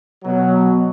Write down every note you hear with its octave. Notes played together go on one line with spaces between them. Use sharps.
B2 F#3